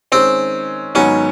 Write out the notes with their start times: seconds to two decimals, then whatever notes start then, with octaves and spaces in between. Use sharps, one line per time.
0.12 D#3 G#3 C4 C#4
0.95 G#2 D#3 F#3 B3 C#4